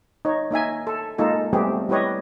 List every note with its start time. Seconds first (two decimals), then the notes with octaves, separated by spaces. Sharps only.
0.25 D#4 C#5
0.51 A#3 D#4 E5 G#5
0.87 A4
1.18 G#3 A#3 D#4 F4 A4
1.53 G3 A3 B3 C4 G4 G#4
1.89 G3 E4 G4 B4 C#5 D#5